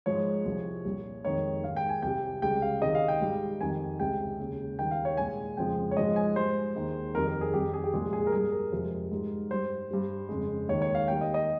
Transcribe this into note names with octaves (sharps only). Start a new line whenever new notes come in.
G#2 F3 G#3 C#5
C2 C3 F3 G#3
C2 A#2 G3
F2 D#3 G#3 C#5
G#2 D#3 G#3 F5
G5
G#5
C2 C3 G3 G5
C#2 C#3 G3 G5
F5
C#2 C3 D#3 G#3 D#5
F5
G5
G#2 G3
F2 D#3 G3 G#5
C#2 C3 G3 G5
D#2 C#3 G#3
D#2 D#3 G3 G5
F5
C#5
C2 A#2 G#3 G#5
F2 C#3 F3 G#3 G5
C#5
G#2 F3 G#3 D#5
G#5
G#2 G3 C5
D#2 D#3 G#3
F2 D#3 G3 A#4
A#4
G#4
F2 D#3 G3 G4
G#4
G4
C2 A#2 F3 G#3 G#4
G#4
A#4
G2 G3 G#4
A#4
F2 C3 F3 G#3
G#2 G3
G2 G3 C5
G2 G3
F2 C#3 G#3
D#2 D#3 G#3 C#5
C#5
F5
D#2 D#3 G3 G5
D#5
D#5